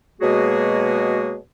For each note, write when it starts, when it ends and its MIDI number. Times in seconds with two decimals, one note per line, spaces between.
0.22 1.37 47
0.22 1.37 54
0.22 1.37 56
0.22 1.37 58
0.22 1.37 66
0.22 1.37 68